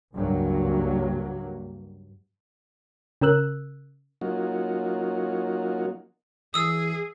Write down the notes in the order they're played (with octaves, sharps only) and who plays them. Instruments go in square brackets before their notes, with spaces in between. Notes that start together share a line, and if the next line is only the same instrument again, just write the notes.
[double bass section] C#2 G2 F#3 A#3
[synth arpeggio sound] C#3 C#4 A#4 E6 F#6
[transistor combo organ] F#3 A#3 C#4 D#4 F4 F#4
[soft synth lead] E3 [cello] G#4 [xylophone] D#6 E6